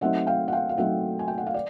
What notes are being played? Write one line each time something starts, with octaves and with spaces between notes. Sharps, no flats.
F#3 A3 C4 D#4 E5 F#5
F5 G5
F#5
F5 G5
F5
F#3 A3 C4 D#4 E5 F#5
G#5
G5
F#5
F5
D5